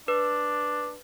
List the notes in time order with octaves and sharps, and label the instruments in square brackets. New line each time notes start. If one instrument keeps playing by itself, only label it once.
[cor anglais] D4 [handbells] B4